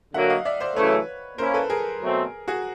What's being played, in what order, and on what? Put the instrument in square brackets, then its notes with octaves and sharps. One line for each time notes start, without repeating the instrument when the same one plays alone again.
[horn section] D3 F#3 A#3 [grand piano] E5 F#5
[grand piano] D#5 F5
D5 E5
C5 D5
[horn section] F#2 C#3 E3 A3 [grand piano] B4 C#5
[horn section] A#3 C#4 E4 [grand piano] A#4 C5
[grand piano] A4 B4
G#4 A#4
[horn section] B2 F#3 A3 C4
[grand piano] F#4 G#4